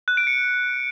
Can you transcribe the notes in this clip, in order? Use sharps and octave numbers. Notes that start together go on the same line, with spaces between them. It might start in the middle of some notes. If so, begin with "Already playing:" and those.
F#6
D7
C#7